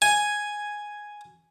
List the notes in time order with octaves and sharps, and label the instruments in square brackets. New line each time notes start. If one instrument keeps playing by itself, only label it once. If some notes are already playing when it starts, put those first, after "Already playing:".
[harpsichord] G#5